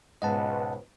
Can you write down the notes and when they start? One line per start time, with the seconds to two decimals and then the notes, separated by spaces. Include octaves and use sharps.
0.22 C#2 G#2 B2 B4 D#5 F#5 A5